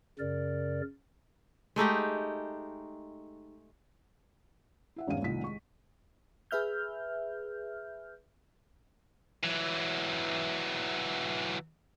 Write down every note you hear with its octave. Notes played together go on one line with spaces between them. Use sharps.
F#2 C#3 A#4 D5
G#3 A3 D#4 G4
E4 E5 F#5
G#1 E2 G2 C#4 F5 D#7
C2 A2 D#3 F4 B6
G#3 C#6
G#4 B4 E5 F6 G6
E3 F#3